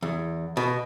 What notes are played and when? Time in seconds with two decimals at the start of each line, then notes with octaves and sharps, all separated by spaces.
0.03 E2
0.57 B2